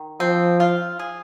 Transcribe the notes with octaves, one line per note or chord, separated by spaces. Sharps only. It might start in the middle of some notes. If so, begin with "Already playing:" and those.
Already playing: D#3
F3 C4
F4
G#4